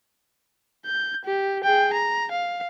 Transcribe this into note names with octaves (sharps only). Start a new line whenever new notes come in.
G6
G4
G#4 G5
A#5
F5